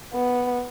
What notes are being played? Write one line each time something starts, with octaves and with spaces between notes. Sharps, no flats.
B3